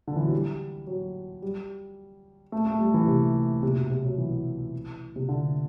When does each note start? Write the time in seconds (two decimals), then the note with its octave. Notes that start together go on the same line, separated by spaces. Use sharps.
0.08 D3
0.16 E3
0.24 F#3
0.33 G3
0.87 F#3
1.42 G3
2.52 A3
2.67 A3
2.80 G3
2.94 E3
3.08 C3
3.63 C3
3.76 B2
3.90 C3
4.05 F#3
4.18 E3
5.16 C3
5.28 D3